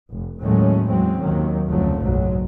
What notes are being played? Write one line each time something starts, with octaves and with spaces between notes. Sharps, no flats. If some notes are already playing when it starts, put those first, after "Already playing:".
F1
D#2 A2 F#3 G#3 A3 C#4
E2 F#3 G#3 C4 C#4
D#2 D#3 F#3
F1 D2 C#3 F3 F#3 A3
F#1 B1 G#2 F#3